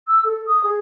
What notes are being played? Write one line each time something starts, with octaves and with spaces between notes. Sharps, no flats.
E6
A4
D#6
G#4